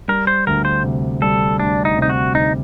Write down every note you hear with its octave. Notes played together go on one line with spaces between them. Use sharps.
G3 A#4
C5
D2 A#4
C5
C3
G3 A4
D2 D4
D#4
C3 D#4
F#4
D2 D#4